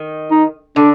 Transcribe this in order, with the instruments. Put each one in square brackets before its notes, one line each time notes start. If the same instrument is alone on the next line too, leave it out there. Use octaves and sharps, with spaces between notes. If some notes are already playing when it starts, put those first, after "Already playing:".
Already playing: [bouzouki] D#3
[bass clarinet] D#4
[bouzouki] D3 [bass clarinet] D4